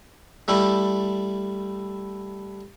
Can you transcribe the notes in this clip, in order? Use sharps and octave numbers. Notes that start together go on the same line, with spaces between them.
G3 A3 E4